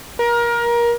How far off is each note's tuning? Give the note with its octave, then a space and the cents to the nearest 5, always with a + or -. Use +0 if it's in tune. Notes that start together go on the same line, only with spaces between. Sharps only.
A#4 +25